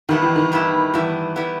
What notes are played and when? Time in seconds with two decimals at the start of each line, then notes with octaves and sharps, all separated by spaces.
0.09 G2 D#3 G3 B3 E4
0.22 E3
0.36 D#3
0.52 G2 G3 B3 E4
0.94 G2 E3 G3 B3 E4
1.36 G3 B3 E4